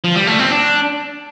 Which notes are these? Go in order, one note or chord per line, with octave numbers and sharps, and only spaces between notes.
F3
G3
A3
C4
D4